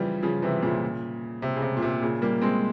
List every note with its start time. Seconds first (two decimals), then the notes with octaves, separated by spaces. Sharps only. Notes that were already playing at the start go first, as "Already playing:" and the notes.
Already playing: C#3 E3 F3 G3
0.23 C#3 F3
0.42 C3 E3
0.62 A#2 C#3
1.42 C3
1.56 C#3
1.62 C3
1.77 A#2
1.82 C3
2.02 A#2 C#3
2.22 G3 A#3
2.41 G#3 C4